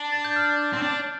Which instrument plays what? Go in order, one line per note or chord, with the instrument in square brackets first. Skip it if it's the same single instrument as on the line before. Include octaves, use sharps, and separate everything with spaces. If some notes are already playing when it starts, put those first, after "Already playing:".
Already playing: [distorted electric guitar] D4
[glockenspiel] A6
G6
F6
[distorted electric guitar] C4
D4